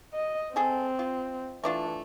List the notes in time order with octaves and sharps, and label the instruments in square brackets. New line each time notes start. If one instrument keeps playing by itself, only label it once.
[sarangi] D#5
[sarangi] C4 [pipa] G#4 A4
[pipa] F4
[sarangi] E3 [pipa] A3 D4 F4